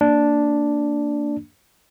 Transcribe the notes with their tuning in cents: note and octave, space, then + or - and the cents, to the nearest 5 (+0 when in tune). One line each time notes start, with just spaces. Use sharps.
A#3 -20 D4 -5